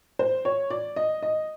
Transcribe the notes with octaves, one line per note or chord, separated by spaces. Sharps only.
C5
C#5
D5
D#5
D#5